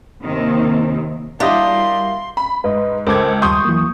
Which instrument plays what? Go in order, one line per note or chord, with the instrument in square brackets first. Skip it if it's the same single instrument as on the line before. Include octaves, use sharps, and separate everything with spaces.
[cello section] D#2 C3 D#3 C4
[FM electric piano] G3 E4 F#4 [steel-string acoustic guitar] A#3 [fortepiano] D4 G4 D#5 [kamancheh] C6
[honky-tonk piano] B5
[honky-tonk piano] G#2 [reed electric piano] B4 D#5
[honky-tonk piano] C#2 A4 G#6 [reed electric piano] A#4 C5 D6
[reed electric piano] D#2 G3 C6 [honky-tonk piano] C#6 D#6 G6
[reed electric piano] E3 F#3 A#3